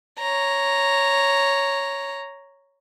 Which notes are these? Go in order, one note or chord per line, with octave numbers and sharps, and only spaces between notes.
C#5 A#5